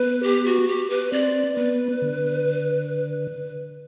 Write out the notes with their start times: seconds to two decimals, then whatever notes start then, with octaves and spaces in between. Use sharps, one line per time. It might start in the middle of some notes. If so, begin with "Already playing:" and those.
Already playing: B3 B4
0.23 G4
0.45 F#4
0.67 G4
0.90 B4
1.12 C4 D5
1.57 B3 B4
2.02 D3